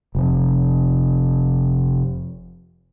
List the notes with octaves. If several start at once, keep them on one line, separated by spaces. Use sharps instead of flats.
F1 F2